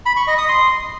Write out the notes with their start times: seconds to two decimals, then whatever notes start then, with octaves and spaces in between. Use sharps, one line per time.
0.06 B5
0.17 C#6
0.27 D#5
0.38 D#6
0.49 C6